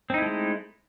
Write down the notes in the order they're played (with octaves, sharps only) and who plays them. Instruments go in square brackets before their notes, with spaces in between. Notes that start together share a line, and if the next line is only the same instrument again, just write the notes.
[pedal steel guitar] C4
D#4
E4
A3
G#3